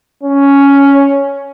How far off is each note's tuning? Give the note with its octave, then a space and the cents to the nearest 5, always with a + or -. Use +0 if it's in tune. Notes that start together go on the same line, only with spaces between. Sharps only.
C#4 +5